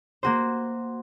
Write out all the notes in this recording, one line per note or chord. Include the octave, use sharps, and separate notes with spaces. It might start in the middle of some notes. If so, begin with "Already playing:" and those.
A#3 F#4 C5